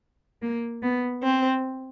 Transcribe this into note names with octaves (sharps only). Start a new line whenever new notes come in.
A#3
B3
C4